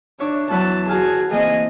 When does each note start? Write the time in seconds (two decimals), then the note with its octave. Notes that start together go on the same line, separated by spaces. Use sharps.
0.20 D4 C#5 E5 D6
0.50 E2 F#3 B4 A5
0.89 F#4 G#4 A5 F6
1.31 E3 A#3 C4 G#4 D#5